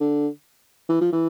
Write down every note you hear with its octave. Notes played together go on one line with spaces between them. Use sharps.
D3
E3
F3
E3